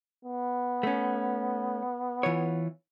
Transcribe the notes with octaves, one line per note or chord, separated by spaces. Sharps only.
B3
A3 C#4
E3 F4 C#5